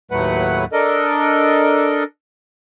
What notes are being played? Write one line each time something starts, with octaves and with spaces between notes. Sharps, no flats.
D#2 A2 F#3 A3 B4 F#5
D4 A4 A#4 D#5